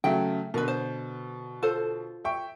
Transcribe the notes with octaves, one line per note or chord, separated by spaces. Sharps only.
C#3 F#3 A3 G5
B2 D3 A#4 B4
C5
F4 A4 C5
E5 G5 C#6